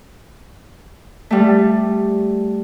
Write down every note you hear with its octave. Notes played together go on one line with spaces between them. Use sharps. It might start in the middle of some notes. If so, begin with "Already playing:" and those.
G3 A3